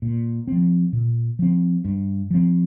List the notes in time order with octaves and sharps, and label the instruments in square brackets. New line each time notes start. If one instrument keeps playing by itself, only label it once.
[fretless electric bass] A#2
F3 C4
A#2
F3 C4
G2
F3 C4